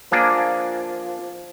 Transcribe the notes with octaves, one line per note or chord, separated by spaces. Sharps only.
F3 A#3 D4 G#4